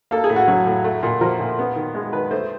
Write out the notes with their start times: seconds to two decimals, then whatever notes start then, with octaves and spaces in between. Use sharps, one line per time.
0.11 A#3 A4
0.24 G#4
0.30 A2
0.36 F#4
0.48 F#3
0.66 A2
0.84 A3
1.03 A#2
1.21 F3 A#4
1.40 A#2
1.59 B3
1.76 D#3
1.95 G#3
2.13 D#3 B4
2.31 A3 C5